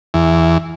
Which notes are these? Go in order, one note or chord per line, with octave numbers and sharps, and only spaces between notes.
E2